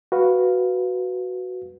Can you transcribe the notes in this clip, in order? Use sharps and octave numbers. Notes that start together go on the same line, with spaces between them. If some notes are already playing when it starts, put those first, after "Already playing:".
F#4 B4 F5